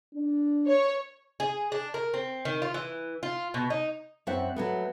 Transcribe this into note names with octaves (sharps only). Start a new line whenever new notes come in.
D4
C#5
G#4
D4
A#4
C4
D#3
F4
E3
F4
B2
D#4
F#2 C4 D5 E5 F#5
F#3 A3 B3